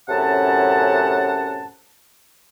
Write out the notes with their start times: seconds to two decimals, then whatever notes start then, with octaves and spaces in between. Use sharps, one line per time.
0.09 F#2 A2 C3 C#4 F#5 A5